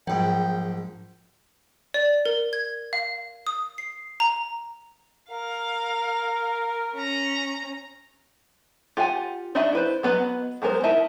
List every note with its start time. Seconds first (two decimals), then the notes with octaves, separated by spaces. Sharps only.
0.07 A#1 G#2 F#3 G5
1.94 D5
2.25 A#4
2.53 G#6
2.93 F5
3.47 D#6
3.78 C7
4.20 A#5
5.31 A#4 F5
6.95 C#4 A#5
8.97 F4 G4 F#5 G#5
9.55 D4 D#4 F#4 D#5 E5
9.73 E4 B4 C5
10.03 F#3 B3 B4 D#5
10.62 F#3 G#3 B3 A#4 C5
10.83 D#4 E4 A#4 E5 A5